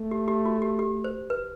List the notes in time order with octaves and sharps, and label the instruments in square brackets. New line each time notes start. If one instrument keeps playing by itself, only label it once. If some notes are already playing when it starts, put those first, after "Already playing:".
Already playing: [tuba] A3
[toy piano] G4
G4
F#4
G4
G4
C5
B4